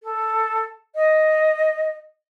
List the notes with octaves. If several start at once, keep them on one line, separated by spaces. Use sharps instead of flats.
A4
D#5